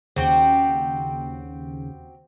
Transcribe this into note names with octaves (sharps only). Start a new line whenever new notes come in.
D#2 C#3 C4 F#4 G4